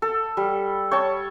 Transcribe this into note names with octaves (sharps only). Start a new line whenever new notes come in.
A4
G3
C#5 G5 A5